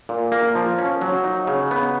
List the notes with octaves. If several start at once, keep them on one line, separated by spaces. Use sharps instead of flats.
A#2
A#3
F3
C#4
F#3
D#4
C#3
B3